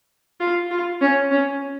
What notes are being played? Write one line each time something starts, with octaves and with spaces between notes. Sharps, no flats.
F4
F4
C#4
C#4